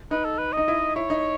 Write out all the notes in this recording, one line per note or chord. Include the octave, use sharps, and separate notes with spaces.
D#4 B4
A4
B4
D#4 D#5
E4
E4 C#5
D#4